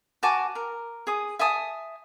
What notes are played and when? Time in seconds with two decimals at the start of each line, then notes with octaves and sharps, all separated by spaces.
0.23 F#4 G#5 A5 D6
0.55 A#4
1.07 G#4 D#6
1.39 E5 G#5 A5 D#6